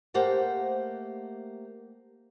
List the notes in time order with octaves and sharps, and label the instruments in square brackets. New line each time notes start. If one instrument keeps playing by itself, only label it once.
[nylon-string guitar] A3 A#3 G4 C5 F#5